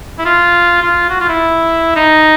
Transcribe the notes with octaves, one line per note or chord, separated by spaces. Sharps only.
E4
F4
F4
F#4
F4
E4
D#4